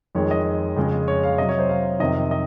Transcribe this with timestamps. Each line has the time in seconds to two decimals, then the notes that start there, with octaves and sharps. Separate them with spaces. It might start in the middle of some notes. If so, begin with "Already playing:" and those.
0.15 F2 D#3 G#3 C#5
0.31 D#5
0.76 F2 C#3 G#3
1.08 C#5
1.23 F5
1.38 C3 F#3 D#5
1.49 C#5
1.59 C5
1.69 F5
2.00 F2 C3 D#3 D#5
2.31 D#5